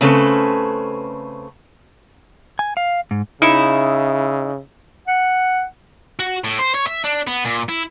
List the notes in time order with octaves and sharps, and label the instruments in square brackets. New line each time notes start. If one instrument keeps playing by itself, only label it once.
[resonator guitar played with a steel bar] C#3 A3 C4 C#4 A4 B4
[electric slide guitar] G#5
F5
G#2
[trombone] C#3 [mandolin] D#4 E4 E5
[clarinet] F#5
[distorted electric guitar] F#4
A2
C5
C#5
E5
D4
B3
A#2
E4